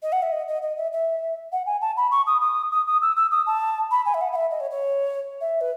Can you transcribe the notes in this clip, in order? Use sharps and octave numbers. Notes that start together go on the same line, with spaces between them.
D#5
F#5
E5
D#5
D#5
D#5
E5
E5
F#5
G#5
A5
B5
C#6
D#6
D#6
D#6
D#6
E6
E6
D#6
A5
B5
G#5
E5
F#5
F#5
E5
D#5
C#5
C#5
E5
B4